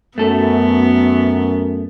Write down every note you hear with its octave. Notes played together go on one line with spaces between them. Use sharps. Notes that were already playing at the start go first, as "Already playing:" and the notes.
F#2 A3 B3 A4